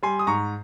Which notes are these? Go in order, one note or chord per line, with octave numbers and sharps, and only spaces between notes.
G3 G#5 C6
D#6
G#2 A#5 C#6